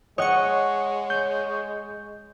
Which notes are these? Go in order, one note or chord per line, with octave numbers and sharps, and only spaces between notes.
G#3 C#5 D#5 F#5 C#6
G6